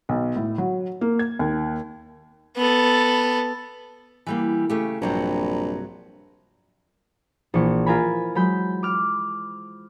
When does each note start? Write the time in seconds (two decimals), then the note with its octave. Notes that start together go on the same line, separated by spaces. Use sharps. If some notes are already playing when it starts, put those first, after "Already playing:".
0.09 B1
0.36 A2
0.58 F#3
1.01 A#3
1.19 G#6
1.39 D#2
2.57 B3 A4
4.26 E3 G3 A#3
4.70 C#3 A3 G4
5.02 A#1 G2 C3 F#3
7.54 A#1 E3 C#6
7.86 F4 A#4 E5 F5 G#5 B5
8.35 F#3 G#3 B5 G6
8.83 D6 F6